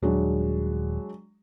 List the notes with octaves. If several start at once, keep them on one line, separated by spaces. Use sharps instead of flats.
D#1 F#3 G#3 D4